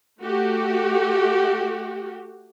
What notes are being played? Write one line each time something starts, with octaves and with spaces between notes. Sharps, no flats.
A3 F#4 G4